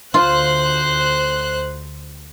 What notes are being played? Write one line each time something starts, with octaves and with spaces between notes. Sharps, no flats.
D2 F4 C5 F#6